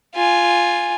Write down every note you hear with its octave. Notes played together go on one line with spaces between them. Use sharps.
F4 G#5